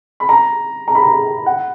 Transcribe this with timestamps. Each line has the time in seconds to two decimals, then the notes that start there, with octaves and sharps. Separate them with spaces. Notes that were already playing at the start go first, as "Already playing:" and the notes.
0.20 B5
0.29 A#5
0.88 A#5
0.95 B5
1.03 A#5
1.46 F#5